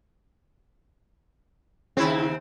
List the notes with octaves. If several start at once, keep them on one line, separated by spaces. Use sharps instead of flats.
D#2 C#3 C4 E4